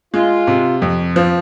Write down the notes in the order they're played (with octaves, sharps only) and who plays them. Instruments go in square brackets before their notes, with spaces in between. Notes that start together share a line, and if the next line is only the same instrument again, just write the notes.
[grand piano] G#3 [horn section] F4
[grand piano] C3
F2
F3